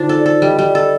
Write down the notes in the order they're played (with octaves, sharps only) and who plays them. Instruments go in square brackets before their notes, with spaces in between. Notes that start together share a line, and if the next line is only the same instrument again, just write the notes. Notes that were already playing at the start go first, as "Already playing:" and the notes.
Already playing: [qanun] D3 D4 [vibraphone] D#4 F4 C5
[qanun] A4
[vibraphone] D5
[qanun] A4
[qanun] G3 [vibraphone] D#5
[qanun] G3
[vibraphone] D5
[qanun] A4